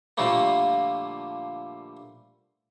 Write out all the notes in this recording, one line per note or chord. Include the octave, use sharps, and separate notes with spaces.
A#2 D3 F3 G3 A3 A#3